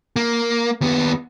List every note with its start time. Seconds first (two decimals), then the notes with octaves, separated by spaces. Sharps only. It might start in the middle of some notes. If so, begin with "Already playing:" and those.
0.16 A#3
0.81 D#2 B3